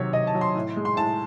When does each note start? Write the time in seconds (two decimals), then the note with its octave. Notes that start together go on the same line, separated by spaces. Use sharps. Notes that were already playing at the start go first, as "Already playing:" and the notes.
Already playing: C3 D#3 F#3 C#5
0.13 C3 D#5
0.27 A5
0.35 F#3
0.41 C6
0.55 A2
0.76 G#3
0.85 C6
0.97 A2 A5